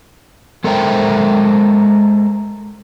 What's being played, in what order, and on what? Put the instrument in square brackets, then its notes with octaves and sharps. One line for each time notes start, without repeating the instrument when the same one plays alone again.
[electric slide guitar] G#3 A4 A#4 C5 E5 G5